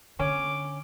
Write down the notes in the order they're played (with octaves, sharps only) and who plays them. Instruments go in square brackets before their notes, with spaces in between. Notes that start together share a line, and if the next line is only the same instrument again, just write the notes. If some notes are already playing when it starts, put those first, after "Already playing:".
[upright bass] D3 [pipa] C#4 [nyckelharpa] D6